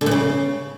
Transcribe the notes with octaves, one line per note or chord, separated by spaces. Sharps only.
D3
A#2
C#3